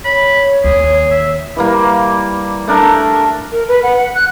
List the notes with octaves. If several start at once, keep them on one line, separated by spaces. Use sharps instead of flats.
C#5 B5
D#2 G#4
E5
E3 G3 A#3
A3 D4 A#4
A#4
B4
F#5
F#5
F#6